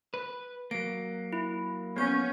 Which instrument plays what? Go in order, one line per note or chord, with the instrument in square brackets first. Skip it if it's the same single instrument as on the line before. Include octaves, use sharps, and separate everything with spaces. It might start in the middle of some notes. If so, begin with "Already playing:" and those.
[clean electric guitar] B4
[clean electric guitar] F#3 A#3 [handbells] D7
[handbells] E4
[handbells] B3 G6 [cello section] C#4